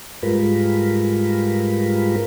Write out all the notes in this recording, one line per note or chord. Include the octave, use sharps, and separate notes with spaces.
G#2 G3 G#3 F4 A#4 B4